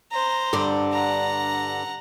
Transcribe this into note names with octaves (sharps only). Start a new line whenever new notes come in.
C5 A#5
G2 D3 D4
F#5 A#5